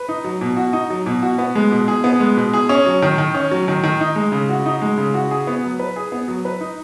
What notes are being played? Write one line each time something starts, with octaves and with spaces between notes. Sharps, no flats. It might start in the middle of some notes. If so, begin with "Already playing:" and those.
Already playing: B4
D#4
F#3
B2
F#4
D#4
F#3
B2
F#4
B3
G#3
B2
G#4
B3
G#3
B2
G#4
C#4
F#3
D#3
D#3
C#4
F#3
D#3
D#3
D#4
G#3
C#3
F#4
D#4
G#3
C#3
F#4
G#4
B3
F#3
B4
G#4
B3
F#3
B4
D#4